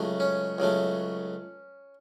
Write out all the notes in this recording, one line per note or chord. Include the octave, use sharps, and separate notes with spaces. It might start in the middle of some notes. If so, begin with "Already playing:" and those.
Already playing: C#2 C#3 F#3 A3
C#4
C#2 C#3 F#3 A3